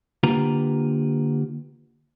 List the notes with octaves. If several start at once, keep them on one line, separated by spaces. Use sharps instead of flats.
D3 A#3 F4 G4 B4 A#5